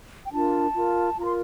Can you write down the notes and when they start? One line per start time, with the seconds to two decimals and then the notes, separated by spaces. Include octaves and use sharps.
0.27 G5
0.33 D4 F4 A#4 A5
0.75 F4 A#4
1.17 F4 A#5
1.22 A#4 C6